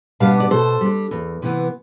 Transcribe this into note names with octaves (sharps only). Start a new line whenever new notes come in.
B2 G3 B3 D4 F5 A5
D5
B2 A4 C5
G3 D4
E2
C3 E3 B3